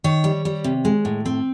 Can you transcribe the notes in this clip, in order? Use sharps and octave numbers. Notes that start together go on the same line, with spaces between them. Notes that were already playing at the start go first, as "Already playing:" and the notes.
D#3 C#5
G3
G3
C3
G#3
A2
C4